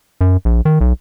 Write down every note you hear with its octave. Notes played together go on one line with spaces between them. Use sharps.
F#2
A#1
D#3
B1